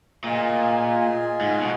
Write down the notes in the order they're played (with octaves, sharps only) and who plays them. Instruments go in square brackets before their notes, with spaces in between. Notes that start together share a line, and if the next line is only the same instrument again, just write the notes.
[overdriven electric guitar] A#2 [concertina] F4 G#4 D#5 G#5
[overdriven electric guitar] G#2
B2